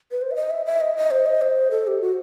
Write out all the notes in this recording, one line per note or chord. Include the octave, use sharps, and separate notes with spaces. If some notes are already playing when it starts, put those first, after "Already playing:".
B4
C5
E5
D#5
E5
E5
D#5
D#5
C5
D#5
C5
A4
G4
F#4